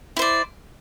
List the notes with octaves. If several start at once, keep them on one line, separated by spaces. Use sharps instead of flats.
E4 C5 D5